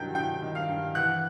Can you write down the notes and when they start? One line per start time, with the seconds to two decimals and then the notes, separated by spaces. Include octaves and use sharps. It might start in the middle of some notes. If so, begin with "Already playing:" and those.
Already playing: G2 D#3 F#3 G5 G6
0.15 G2 G5 G6
0.42 D#3
0.55 F5 F6
0.69 G2
0.95 E3 F#5 F#6